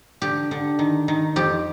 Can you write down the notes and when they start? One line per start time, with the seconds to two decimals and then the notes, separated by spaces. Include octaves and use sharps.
0.22 D3 G4
0.51 D3
0.79 D#3
1.08 D#3
1.36 F2 G4